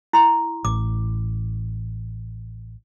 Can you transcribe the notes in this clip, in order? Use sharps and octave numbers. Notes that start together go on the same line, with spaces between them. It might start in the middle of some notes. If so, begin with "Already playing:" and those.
E4 C6
A1 D6